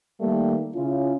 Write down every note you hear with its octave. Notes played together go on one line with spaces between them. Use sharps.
D#3 G3 A3 A#3
C#3 C#4 E4 F4